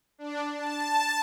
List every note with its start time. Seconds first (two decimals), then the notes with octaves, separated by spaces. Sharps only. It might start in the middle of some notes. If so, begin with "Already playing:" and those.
0.18 D4
0.54 A5